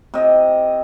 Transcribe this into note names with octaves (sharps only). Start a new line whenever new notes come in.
C3 D#5